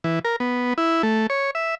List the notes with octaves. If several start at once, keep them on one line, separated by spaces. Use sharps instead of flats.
E3
A#4
B3
E4
A3
C#5
E5